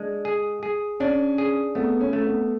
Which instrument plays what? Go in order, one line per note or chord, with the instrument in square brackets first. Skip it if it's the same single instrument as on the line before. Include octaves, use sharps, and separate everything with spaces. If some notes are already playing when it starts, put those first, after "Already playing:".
Already playing: [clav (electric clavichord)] G#3 D4
G#4
G#4
[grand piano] C#4 [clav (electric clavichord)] D4
[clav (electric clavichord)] G#4
[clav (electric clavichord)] A3 [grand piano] B3
[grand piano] C#4
[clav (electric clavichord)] A3
[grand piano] B3